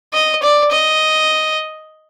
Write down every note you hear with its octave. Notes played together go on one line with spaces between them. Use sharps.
D#5
D5
D#5